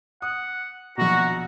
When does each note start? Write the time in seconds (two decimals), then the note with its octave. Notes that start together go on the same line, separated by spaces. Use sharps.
0.22 F#5 D#6
0.98 A#1 B2 F#4 A#5